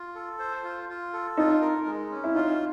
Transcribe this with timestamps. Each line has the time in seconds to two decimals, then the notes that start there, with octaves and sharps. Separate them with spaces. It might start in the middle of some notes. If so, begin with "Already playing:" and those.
Already playing: F4
0.15 A4
0.39 C5
0.64 F4
0.89 F4
1.13 A4
1.37 D#4 F4
1.61 A#4
1.86 G#3
2.11 C#4
2.24 E4
2.35 D#4 F4